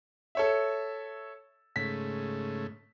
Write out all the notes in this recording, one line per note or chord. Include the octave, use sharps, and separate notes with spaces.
A4 C#5 E5
G#2 C#3 A3 B6